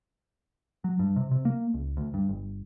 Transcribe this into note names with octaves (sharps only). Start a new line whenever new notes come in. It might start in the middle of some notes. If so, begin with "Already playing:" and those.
F#3
G2
C3
C3
A#3
C#2
D2
G2
G1